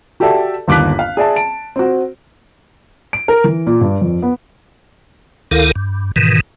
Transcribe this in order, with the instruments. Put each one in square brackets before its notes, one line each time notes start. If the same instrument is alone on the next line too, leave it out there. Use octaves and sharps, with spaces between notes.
[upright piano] F#4 G4 A4 D5 E5 A5
G1 D#2 D6 F#6 B6
F5
G#4 D5 E5 A5
A5 D7
C4 F#4
[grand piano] D7
A#4
E3
A#2
G2
F2
B3
[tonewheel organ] D2 D#3 E4 A4 A#4 F5
G2
G#2 B2 D#3 E3